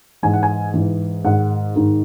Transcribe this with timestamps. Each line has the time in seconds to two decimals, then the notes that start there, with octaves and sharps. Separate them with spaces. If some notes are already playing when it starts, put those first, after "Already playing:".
0.23 G#2 E3 G#5
0.33 F#5
0.43 G#5
0.74 G#2 E3
1.25 G#2 D#3 F#5
1.76 G#2 D#3